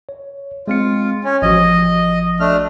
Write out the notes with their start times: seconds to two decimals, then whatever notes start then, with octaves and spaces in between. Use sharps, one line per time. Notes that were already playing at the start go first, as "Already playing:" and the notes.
0.09 C#5
0.68 G#3 C4 F4 C#7
1.24 C#4
1.42 A1 F3 F#4 D#5
2.40 A3 D4 F6